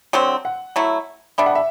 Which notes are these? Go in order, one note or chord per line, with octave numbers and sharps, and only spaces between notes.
D3 F#3 C4
F#5
F#3 A3 E4
G3 B3 D4 E5
F#5
E5